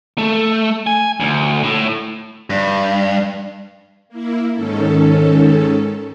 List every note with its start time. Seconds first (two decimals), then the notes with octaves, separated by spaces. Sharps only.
0.18 A3
0.87 G#5
1.20 D2
1.63 A2
2.50 G2
4.09 A#3 E4
4.53 G#2 D#3 C#4 A4